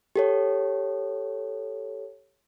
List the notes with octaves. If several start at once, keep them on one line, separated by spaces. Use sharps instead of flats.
G4 A4 C#5